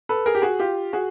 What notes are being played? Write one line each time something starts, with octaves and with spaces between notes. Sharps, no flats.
A4 B4
G#4 A#4
G4
F#4 G#4
F4 G4
F#4 G#4